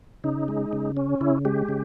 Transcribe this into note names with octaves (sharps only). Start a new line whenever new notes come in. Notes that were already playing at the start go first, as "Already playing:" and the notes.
C#3 D#4
G#3
C#3
C#4
C#3 E4
G#3 G4
C#3